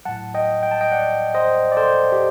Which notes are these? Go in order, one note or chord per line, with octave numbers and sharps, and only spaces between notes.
A2 F#3 F#5 A5
D#5 G5
G5
A5
D#5 G5
D5 F#5
C5 D#5
D5
A4 C5
G4